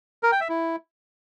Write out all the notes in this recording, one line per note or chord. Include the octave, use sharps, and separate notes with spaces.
A#4
G5
E5
E4